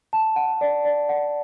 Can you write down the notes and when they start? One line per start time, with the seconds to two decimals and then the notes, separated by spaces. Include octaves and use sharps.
0.13 A5
0.36 F#5
0.61 D5
0.85 D5
1.09 F#5